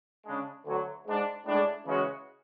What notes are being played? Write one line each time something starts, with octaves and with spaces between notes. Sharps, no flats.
C#3 G#3 D4
D2 D3 F#3
G#2 G#3 D4
A2 G#3 D4 G#4
C#3 E3 G#3 C#4 F#4